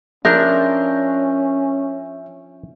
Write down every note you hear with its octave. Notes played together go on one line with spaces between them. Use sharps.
F3 C#4 D4 A#4 E5 G6